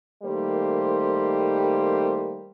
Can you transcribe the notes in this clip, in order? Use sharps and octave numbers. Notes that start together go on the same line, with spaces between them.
D#3 G3 A3 A#3 C5